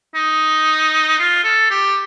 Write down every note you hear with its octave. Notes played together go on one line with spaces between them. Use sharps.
D#4
F4
A4
G4